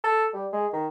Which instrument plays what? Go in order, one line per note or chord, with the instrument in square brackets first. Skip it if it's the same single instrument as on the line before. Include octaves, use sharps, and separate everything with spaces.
[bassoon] A4
G3
G#3
D#3